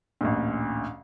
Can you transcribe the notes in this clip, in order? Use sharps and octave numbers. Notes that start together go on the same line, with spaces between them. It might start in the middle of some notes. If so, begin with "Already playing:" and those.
A1 D2 A#2